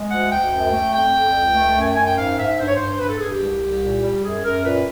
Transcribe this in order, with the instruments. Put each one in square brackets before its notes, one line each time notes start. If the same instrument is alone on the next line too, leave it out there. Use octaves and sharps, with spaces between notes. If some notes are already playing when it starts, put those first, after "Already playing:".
Already playing: [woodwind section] G#3
D2 F#5
D2 G5
F#2
A3
F2 G5
F2
C#2
A3
F#2 G#5
G5
F#2 G#5
G5
G#2 F5
G#2 E5
G2 C5
C#5
G2 C5
G2 B4
A4
G2 G#4
G4
C2
C2
A#2
G3
F#2 G#4
F#2 A#4
A#2 B4